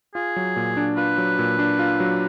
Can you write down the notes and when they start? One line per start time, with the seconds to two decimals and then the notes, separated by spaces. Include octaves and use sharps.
0.15 F4 G#4
0.36 F#3
0.56 A#2
0.77 D4
0.97 F4 B4
1.18 F#3
1.39 A#2
1.59 D4
1.79 F4
2.00 F#3